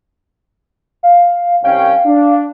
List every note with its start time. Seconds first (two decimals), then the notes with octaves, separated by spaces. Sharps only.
1.03 F5
1.64 C2 C#4 F5 G5
2.06 D4